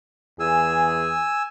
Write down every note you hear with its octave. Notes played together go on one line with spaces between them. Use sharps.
E2 G#4 G#5 E6